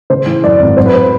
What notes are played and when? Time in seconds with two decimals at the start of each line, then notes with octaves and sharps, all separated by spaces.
0.10 C#3 C5
0.26 E3
0.44 F#2 D5
0.60 G#1
0.77 F#3 C5
0.86 B4
0.94 C5